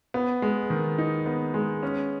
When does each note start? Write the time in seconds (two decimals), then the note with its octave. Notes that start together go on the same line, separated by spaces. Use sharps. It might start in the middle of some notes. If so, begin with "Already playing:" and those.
0.14 B3
0.42 G#3
0.70 D#3
0.98 D#4
1.26 B3
1.54 G#3
1.83 C#4